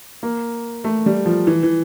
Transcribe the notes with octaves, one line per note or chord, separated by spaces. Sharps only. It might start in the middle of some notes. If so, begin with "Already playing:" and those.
A#3
A3
G3
F3
E3
E3